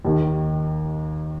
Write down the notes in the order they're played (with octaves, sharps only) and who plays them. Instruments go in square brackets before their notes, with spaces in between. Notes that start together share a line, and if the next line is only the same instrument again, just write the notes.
[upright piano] D#2 D#3